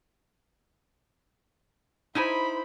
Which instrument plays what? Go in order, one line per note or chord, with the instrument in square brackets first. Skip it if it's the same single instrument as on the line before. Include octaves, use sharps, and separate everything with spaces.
[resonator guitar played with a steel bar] D#4 E4 G#5 [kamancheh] C5 B5